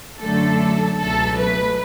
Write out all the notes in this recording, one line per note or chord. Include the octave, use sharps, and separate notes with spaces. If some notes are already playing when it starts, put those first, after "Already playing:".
F#2 D3 F#3 A3 A4
C#2 B2 F#3 A3 A4
B4